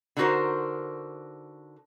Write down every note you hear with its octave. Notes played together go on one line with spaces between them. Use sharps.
D3 D4 D#4 F#4 A#4 C5